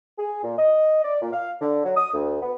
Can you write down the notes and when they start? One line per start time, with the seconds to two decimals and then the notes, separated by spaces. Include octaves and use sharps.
0.18 G#4
0.44 A#2
0.58 D#5
1.04 D5
1.22 A#2
1.33 F5
1.61 D3
1.85 F#3
1.97 D#6
2.14 D2
2.42 B3